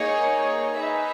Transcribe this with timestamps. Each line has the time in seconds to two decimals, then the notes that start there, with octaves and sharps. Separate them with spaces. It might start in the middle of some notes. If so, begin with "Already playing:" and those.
Already playing: A#3 D#4 G#4 C#5
0.77 D#4 G#4 B4 E5